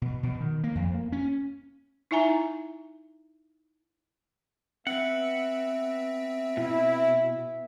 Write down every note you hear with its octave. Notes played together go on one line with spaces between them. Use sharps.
B2
B2
D#3
A#3
F2
A#3
C#4
D#4 E4 E5 G#5 A#5
B3 C4 E5 F#5
B2 E4